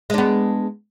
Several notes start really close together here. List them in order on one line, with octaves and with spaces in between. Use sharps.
G#3 D4 B3